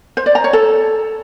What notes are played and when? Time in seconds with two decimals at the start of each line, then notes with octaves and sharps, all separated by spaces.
0.17 C5
0.26 D5
0.35 A#5
0.44 C#5
0.53 A4